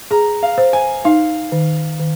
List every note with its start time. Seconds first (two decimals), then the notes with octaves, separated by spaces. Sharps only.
0.11 G#4 A#5
0.43 F5
0.58 C5
0.73 G#5
1.05 D#4 F5
1.52 D#3
2.00 D#3